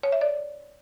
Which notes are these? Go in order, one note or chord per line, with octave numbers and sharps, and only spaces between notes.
C#5
E5
D5